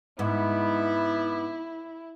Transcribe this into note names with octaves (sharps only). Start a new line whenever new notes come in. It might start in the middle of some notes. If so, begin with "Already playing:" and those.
G#2 B3 E4 D6